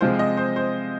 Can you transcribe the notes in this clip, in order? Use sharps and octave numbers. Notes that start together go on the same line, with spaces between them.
C3 F3 G#3 F4 C5
D#5
C5
C5